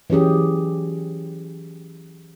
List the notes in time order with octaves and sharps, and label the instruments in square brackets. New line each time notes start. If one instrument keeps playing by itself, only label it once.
[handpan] E3 F#3 C#4 G4 G#4